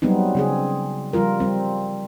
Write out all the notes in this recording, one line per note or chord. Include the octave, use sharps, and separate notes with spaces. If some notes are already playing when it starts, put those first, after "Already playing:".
F#3 G3 B3 C4 D#4
C#3 C4 G#4
F3 G3 F4 A#4
G3 C4